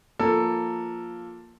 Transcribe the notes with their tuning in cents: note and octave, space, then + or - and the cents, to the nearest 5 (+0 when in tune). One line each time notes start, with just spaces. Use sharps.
F3 +0 A#3 +0 A4 +5